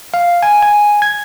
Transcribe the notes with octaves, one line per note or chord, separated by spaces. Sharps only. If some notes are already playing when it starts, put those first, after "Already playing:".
F5
G#5
G#5
G#6